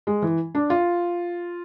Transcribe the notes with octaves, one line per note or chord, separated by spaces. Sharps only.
G#3
E3
D4
F4